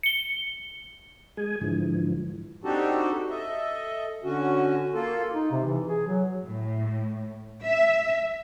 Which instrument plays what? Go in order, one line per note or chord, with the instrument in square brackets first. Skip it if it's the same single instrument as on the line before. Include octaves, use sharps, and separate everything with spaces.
[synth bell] C#7 G7
[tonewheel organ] G#3 G#4 G#5
G#2 D3 E3 F3
[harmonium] C4 D4 D#4 F#4 G4 A4
A4 D#5 E5
D3 C#4 F#4
A#3 F4 A4
[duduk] D#4
C3
E3
G#4
F#3
[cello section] A2
E5